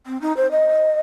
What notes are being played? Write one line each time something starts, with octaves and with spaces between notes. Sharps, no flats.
C4
D#4
C5
D#5